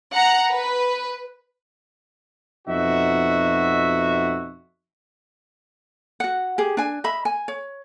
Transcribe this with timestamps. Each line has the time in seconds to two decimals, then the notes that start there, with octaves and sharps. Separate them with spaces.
0.15 F#5 A#5
0.51 B4
2.67 F2 B2 D#4 F#4 E5
6.20 F#4 F#5
6.58 G4 G#4
6.77 D4 G#5
7.04 D#5 E5 B5
7.25 G#5
7.48 C#5